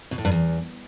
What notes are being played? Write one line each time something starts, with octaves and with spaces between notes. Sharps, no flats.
B2
A2
G2
E2